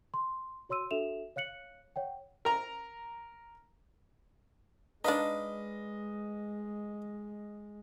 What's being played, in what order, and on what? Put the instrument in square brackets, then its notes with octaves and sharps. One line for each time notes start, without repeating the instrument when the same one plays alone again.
[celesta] C6
F#4 C#5 C6 E6 D#7
D4 F#4 A4 E5 E7 F7
C#5 F5 F#6 C#7 F#7
C#5 F#5 G5
[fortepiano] A#4 A#5
[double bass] G#3 [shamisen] D4 D#4 [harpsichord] B4 F5 D6 [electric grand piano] D#5